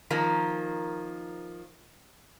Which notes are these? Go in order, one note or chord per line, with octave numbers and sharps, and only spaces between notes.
D#3 F3 A#3